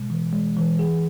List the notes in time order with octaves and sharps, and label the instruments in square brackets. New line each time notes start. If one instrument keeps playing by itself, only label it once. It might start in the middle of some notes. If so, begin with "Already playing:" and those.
Already playing: [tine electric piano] B2 G#3
E3
G#3
E3
G#4